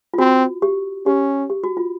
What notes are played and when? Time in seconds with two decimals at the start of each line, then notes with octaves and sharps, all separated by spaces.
0.14 F4
0.18 C4 F#4
0.62 G4
1.06 C#4 G4
1.50 G4
1.64 F#4
1.77 F4